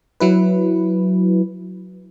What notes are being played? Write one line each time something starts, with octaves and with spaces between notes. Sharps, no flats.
F#3 E4 B4